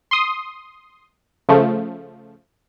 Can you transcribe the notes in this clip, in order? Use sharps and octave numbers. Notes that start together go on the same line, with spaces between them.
C6 D#6
C#3 F3 A3